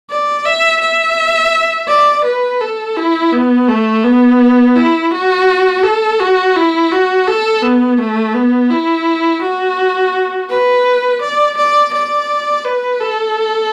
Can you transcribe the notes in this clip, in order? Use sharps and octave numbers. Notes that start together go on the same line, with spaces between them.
D5
E5
E5
D5
B4
A4
E4
B3
A3
B3
E4
F#4
A4
F#4
E4
F#4
A4
B3
A3
B3
E4
F#4
B4
D5
D5
D5
B4
A4